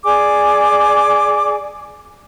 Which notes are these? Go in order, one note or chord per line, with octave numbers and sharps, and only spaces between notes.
G#4 D5 G#5 D6